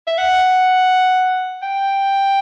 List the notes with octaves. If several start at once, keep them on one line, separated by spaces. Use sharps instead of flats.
E5
F#5
G5